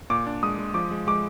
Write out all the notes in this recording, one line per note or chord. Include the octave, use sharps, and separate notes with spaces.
A#2 D6
D4
G#3 D#6
G#3
F3 D6
G#3
G#3 D6